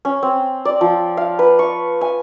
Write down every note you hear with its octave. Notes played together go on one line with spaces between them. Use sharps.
C#4
C4
D5
F3
F5
B4
C#6
G#5